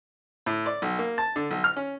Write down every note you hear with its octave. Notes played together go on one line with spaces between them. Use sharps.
A2
D5
B1
A#3
A5
D3
B1
F6
C#4